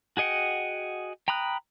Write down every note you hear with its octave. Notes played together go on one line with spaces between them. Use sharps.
F#4 G#4 D#5 F#5 G5
G5 A#5 B5 D#6 F#6